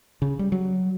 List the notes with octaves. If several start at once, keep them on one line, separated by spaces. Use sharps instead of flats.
C#3
G3
F#3